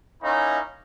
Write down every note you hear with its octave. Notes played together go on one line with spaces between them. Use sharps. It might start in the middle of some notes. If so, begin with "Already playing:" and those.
A#3 C#4 D#4 E4